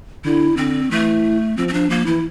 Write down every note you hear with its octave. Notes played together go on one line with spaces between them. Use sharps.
D3 E4
D3 C4
E3 A3
F3 C4
C4
F3 D4
F3 A#3
E3 E4